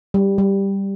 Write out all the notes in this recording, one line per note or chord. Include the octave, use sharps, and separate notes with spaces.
G3
G3